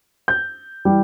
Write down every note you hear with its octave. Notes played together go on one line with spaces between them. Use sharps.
G6
E3 G3